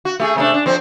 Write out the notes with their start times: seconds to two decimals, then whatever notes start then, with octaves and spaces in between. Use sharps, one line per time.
0.05 F#4
0.20 A3 G4 G#4
0.36 C3 A3 D4
0.54 D4
0.66 F2 C4